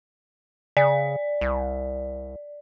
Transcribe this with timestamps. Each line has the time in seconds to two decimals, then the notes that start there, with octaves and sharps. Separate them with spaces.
0.77 C#3 D5
1.41 C2